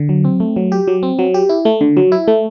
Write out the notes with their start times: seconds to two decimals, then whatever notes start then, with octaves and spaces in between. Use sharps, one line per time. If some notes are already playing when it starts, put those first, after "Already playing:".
Already playing: D3
0.09 F#3
0.25 C4
0.40 A3
0.56 F#3
0.72 G4
0.88 F#3
1.03 C4
1.19 F#3
1.34 G4
1.49 E4
1.65 A3
1.81 D3
1.97 F#3
2.12 E4
2.28 A3